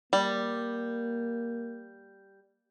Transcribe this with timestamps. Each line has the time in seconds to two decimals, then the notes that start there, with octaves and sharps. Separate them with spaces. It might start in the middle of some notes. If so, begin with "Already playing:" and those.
0.13 G3 A#3